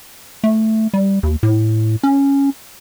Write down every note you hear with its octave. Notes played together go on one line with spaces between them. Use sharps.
A3
G3
D#2
A2
C#4